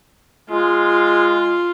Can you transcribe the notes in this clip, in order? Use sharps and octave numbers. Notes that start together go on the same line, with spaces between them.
G#3 F4